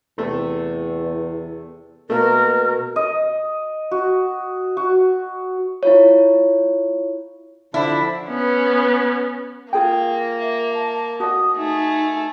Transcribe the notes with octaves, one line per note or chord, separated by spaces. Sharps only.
E2 C3 A3
B2 A3 A#3 A#4
D#5
F#4
F#4
E4 F4 C#5
D3 F3 D4 E4
B3 C#4
A#3 F4 G#4 G5
E5
A5
F#4 D#5 D#6
A3 D#4 G#4